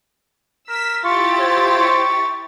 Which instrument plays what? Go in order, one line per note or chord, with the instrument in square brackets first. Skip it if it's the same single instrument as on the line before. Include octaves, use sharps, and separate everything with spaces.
[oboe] A#4 [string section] E6 B6
[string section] E4 G4 A6 [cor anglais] F4 [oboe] C#6
[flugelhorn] C5 [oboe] C#5
[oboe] C#6